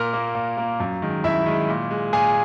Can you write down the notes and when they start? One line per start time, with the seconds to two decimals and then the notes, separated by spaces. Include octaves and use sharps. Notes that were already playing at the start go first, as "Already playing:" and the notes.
Already playing: A#2 A#4 A#5
0.14 A#3
0.35 A#2
0.58 A#3
0.80 F#2
1.02 D#3 G#3
1.24 F#2 E4 E5
1.46 D#3 G#3
1.69 A#2
1.91 G#3
2.13 A#2 G#4 G#5